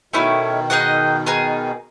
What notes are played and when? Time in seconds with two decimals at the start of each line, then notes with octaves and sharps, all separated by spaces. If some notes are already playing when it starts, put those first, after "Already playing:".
0.13 B2 D#3 A3 C#4 E4
0.70 D#4 G#4 D#5 F#5
1.26 B3 D#4 G#4